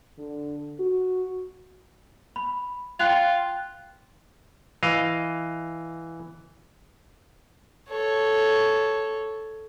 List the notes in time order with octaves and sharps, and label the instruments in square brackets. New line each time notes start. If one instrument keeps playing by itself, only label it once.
[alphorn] D3
F#4
[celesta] B5
[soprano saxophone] F4 [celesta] G5 F#6 F7
[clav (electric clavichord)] E3 D#5 F5
[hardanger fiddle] A4 C#5